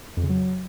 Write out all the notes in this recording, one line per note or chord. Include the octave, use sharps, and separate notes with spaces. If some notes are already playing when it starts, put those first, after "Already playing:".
F2
C#3
F#3